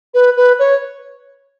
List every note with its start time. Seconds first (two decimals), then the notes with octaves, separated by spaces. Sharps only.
0.14 B4
0.37 B4
0.59 C#5